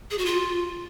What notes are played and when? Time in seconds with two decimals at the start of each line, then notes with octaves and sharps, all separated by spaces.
0.11 G#4
0.18 F#4
0.25 F4